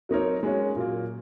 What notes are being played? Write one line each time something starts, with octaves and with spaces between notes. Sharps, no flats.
F#3 C4 D#4 A#4 C#5
G#3 C#4 F#4 C#5
A#2 F#3 A#3